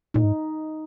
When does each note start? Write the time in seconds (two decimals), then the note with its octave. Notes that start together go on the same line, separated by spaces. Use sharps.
0.14 A#2 D#4
0.23 G#2